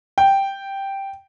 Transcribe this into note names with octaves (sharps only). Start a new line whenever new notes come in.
G5